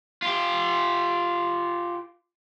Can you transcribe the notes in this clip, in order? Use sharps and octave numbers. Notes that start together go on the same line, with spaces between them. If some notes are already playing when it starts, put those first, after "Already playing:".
F4 G4